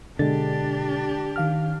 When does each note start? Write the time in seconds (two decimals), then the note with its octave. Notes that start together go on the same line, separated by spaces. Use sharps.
0.19 B2 D3 G#3 D4 G4 A6
1.36 D#3 F5 F6